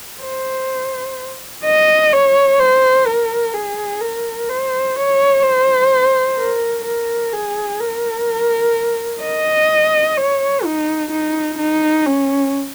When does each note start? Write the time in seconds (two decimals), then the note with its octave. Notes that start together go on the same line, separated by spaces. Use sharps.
0.22 C5
1.65 D#5
2.12 C#5
2.59 C5
3.06 A#4
3.54 G#4
4.01 A#4
4.49 C5
4.96 C#5
5.43 C5
6.37 A#4
6.85 A#4
7.33 G#4
7.80 A#4
9.21 D#5
10.17 C#5
10.64 D#4
11.11 D#4
11.58 D#4
12.06 C#4